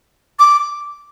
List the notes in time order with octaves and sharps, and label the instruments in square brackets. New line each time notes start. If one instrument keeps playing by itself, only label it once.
[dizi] D6